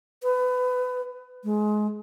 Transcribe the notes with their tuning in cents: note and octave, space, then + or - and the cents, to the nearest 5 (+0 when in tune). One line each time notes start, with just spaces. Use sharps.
B4 +25
G#3 +25